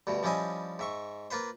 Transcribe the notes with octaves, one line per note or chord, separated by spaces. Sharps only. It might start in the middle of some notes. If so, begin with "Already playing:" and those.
D2 G2 B2
F3 G3 C#4 E4 D#5 G#5
G#2 E5 C#6
A#3 F4 B4 C5